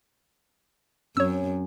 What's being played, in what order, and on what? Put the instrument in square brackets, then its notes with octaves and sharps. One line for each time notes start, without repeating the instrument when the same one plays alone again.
[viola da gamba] F#2 [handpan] C4 C#4 [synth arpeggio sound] C#5 E6